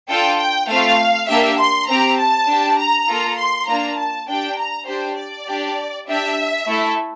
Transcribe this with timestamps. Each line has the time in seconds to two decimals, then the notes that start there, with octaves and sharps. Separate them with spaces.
0.09 D4 F4 A4 G5
0.38 G5
0.68 A3 C4 F4 F5
1.28 A#3 D4 G4 E5
1.59 C6
1.87 C4 G4 A#5
2.18 A5
2.47 D4 G4
2.78 A#5
3.08 A#3 F4 A4
3.37 C6
3.67 A#3 D4 F4 A#5
3.97 A5
4.28 D4 G4 G5
4.58 A#5
4.87 D4 G4 C5
5.16 D5
5.48 D4 G4
6.07 D4 G4 E5
6.67 A3 E4 A4